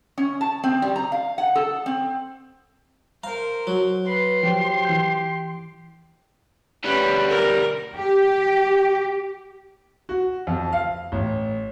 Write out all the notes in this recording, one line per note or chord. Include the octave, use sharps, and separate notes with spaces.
C#4
A5
C4
G3
A#5
F5
F#5
A4
C4
A#4 C5 F5 A#5
F#3
B4 C6
F3 G4 C5
E3 G6
D2 G3 C#4 B4
A#4
G4
F#4
F2
F5
A1